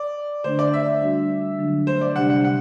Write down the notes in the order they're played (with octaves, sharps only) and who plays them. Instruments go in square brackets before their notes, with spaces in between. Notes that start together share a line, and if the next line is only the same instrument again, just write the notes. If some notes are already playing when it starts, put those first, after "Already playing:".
Already playing: [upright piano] D5
[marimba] D3 A3 D4 [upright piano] C5
[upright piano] D5
E5
[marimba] G3 D4 F#4
D3 F#3 A3 D4
[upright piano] C5
D5
[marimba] C3 G3 D4 G4 [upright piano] F#5
[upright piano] F#5
F#5